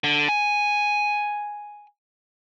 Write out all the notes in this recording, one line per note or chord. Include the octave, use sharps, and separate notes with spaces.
D3
G#5